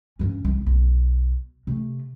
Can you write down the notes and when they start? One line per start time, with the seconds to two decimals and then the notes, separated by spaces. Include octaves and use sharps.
0.19 G2 C#4
0.45 C2
0.66 B1
1.67 C3 A3